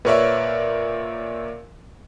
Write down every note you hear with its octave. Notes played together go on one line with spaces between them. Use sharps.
A#2 A#4 B4 C#5 D5 E5